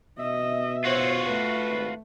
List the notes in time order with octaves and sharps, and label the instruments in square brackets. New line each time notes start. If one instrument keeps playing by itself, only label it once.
[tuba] B2 [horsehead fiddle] D#5 [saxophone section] E5
[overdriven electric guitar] F4 F#4 [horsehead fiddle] C5 C#5
[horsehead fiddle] A3 [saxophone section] B4
[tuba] G#1